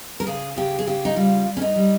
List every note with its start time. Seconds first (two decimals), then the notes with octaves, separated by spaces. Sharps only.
0.20 A#4
0.27 C#3 G#4
0.56 C#3 G4
0.79 G#4
0.87 C#3 G4
1.05 D#4
1.16 G3 F4
1.47 G3
1.57 C#4
1.62 D#4
1.76 G3